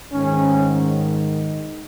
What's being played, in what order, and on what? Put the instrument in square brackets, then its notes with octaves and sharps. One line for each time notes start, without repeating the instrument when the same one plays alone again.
[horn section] G#2 D#3 C#4